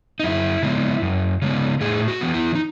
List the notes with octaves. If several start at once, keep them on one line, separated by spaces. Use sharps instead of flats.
D#4
F#2 E4
C#3 G#3 B3
F#2
C#3 G#3 B3
A2 G#4
F#4
E3 B3
E4
D#4